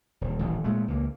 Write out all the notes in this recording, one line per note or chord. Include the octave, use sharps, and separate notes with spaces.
D#1
D#1 A1
A#2 G#3 A3
C#2 A#3